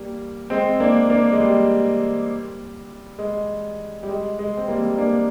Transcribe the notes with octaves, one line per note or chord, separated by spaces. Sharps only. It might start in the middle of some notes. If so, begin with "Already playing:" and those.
Already playing: G3 A#3
G#3 C4
A#3 D4
A#3 D4
G#3
G3
G#3
G3
G#3
G#3
C4
G3 A#3
A#3 D4